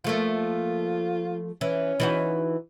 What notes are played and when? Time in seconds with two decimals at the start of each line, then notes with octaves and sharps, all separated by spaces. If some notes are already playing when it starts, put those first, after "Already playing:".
0.04 F3 A3 A#3 F4
1.61 E3 C#4
2.00 E3 D#4 F#4